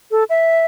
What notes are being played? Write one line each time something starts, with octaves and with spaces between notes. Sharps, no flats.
A4
E5